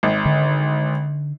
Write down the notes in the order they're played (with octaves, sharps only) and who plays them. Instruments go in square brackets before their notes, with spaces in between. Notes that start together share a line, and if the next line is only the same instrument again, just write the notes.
[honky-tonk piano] G#1
[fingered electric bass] D3